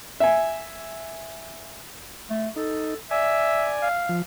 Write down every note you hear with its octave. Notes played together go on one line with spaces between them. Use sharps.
E5 G#5
A3
D#4 A4
D5 E5 G#5
F5
F3